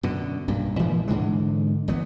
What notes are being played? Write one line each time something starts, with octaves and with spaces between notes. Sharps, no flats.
F#2 B2 D3
B1 G2 A#2
A#2 E3 F3 G#3
G#2 D3 E3 G#3
G1 E3 B3